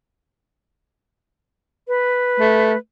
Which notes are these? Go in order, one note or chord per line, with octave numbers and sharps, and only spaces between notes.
B4
A3